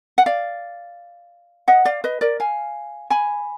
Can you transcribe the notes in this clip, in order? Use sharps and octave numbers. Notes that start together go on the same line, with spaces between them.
F#5
D5 F5
D#5 F#5
D5 F5
B4 D#5
A#4 D5
F5 G#5
G#5 B5